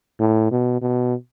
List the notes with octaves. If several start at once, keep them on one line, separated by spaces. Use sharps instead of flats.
A2
B2
B2